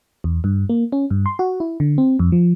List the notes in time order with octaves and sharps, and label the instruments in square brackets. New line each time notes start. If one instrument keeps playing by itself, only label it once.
[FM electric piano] E2
G2
A#3
C#4
G2
C6
F#4
E4
D3
C4
F2
F3